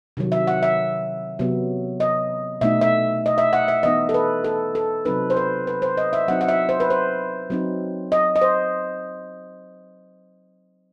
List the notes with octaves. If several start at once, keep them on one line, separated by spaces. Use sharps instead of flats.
C3 D#3 F#3
E5
F#5
E5
C3 F#3 B3
D#5
B2 A3 D#4 E5
E5
D#5
E5
F#5
E5
E3 B3 D#4 D#5
A4
B4
A4
A4
C3 F#3 C4 D#4 B4
C5
B4
B4
C5
D#5
E5
F#3 C4 D#4 F#5
F#5
E5
C5
B4
C5
F#3 C4 D#4
D#5
D#5
C5